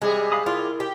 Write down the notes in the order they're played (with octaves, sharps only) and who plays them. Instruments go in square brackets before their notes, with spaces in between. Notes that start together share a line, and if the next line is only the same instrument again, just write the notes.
[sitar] C3 G3 G#4 [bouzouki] G#3
[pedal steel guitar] F5 B5 D#6
[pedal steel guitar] E4 A#4 [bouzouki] F4
[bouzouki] G4